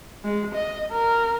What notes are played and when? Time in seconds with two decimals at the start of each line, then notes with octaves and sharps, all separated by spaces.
0.24 G#3
0.54 D#5
0.92 A#4